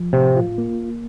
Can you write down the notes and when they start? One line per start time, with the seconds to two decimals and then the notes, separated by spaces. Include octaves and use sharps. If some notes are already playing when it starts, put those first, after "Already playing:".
Already playing: F3
0.13 A2 C3
0.36 F4
0.58 A#3